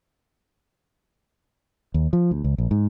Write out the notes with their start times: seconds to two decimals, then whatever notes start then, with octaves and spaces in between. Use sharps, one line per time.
1.94 D#2
2.13 F3
2.31 D2
2.44 C#2
2.58 A#1
2.71 G#2